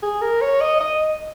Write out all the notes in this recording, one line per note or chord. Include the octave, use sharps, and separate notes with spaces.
G#4
A#4
C#5
D#5
D#5